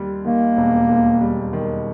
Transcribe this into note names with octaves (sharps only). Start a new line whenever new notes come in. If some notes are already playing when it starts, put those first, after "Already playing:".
Already playing: D#2 G3
D#3 A#3
E1
D#2
G3
D#3